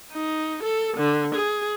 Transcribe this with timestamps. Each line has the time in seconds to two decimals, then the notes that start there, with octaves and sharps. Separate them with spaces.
0.12 D#4
0.63 A4
0.97 D3
1.35 G#4